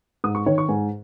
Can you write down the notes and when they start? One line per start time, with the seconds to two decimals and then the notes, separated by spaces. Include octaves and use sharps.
0.24 G#2 D#6
0.35 C#6
0.46 D#3 C#5
0.58 C#6
0.68 G#2 G#5